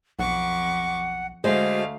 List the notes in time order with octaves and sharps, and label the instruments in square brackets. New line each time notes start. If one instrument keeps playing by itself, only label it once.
[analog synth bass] B1 [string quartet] F2 C#6 D6 [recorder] F#5
[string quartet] D2 A3 F5 [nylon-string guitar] G#3 F#4 C5